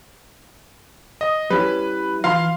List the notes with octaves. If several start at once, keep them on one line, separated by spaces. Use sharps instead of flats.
D#5
G3 C#4 E4 B4
E3 F4 F5 A#5 C6